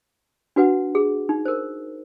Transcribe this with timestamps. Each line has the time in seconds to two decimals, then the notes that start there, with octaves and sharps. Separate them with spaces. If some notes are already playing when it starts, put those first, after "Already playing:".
0.56 D4 F#4 B4 F#5
0.95 G#4
1.29 D#4
1.45 A#4 C5